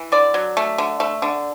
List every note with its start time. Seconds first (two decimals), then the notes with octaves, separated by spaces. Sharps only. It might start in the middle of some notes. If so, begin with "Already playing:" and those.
Already playing: E3
0.12 D3 D5
0.34 F#3
0.57 A3
0.78 D3
1.00 A3
1.22 D3